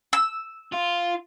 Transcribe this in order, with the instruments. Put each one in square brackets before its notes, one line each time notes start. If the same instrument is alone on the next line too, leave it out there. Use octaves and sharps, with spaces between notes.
[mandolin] E6
[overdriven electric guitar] F4